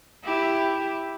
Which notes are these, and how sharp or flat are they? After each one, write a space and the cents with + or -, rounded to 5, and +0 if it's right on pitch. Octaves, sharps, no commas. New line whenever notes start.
E4 +0 G4 +0